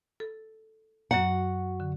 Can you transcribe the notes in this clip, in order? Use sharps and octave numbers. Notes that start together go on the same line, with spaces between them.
A4
F#2 F#3 F#4 F#5
D3